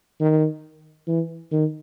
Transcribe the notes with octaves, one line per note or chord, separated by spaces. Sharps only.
D#3
E3
D#3